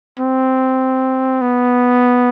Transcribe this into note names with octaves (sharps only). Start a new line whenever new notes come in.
C4
B3